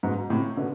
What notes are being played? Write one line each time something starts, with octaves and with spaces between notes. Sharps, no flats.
G#2 B2
A2 C3
B2 D3